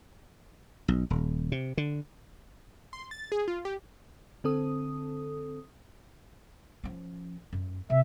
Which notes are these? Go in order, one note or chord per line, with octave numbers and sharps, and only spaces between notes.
B1
D#1
C3
D3
C6
A6
G#4
F4
G4
D3 C4 A4 D#6
F3 C#4
F#2
C3 E5